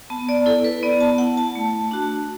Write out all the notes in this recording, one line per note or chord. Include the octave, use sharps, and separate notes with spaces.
B3 A5
D5
E4 A4
B4
B3 D5
A5
E4 F#5
A5
A3
D4 F#4